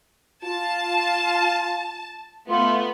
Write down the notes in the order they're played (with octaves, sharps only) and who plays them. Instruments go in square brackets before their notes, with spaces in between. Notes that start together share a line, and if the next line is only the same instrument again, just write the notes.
[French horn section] F4 [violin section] A5
[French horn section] A3 [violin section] B3 [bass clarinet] F4